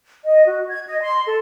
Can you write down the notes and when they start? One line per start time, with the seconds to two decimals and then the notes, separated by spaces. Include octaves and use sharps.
0.24 D#5
0.46 F#4
0.68 G#6
0.88 D#5
1.01 C6
1.26 A4